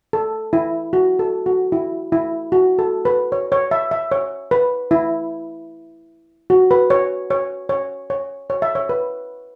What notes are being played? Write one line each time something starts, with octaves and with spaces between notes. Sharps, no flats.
A4
E4
F#4
A4
F#4
E4
E4
F#4
A4
B4
C#5
C#5
E5
E5
C#5
B4
E4
F#4
B4
C#5
C#5
C#5
C#5
C#5
E5
C#5
B4